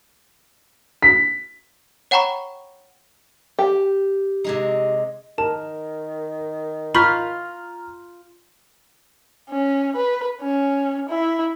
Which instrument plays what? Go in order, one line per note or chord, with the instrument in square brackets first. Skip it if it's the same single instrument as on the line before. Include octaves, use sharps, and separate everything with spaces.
[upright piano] B6
[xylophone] C#5 F#5 G5 A#5 B5 C#6
[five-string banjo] G4
[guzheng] C3 G#3 D#4
[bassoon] D#3 [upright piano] A#4 [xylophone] A5
[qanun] F4 [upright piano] A#5 F6 G6 [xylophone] B5 C#6 B6
[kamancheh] C#4
B4
C#4
E4